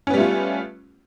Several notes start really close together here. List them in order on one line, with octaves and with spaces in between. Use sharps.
C#4 B3 G3 A3 F4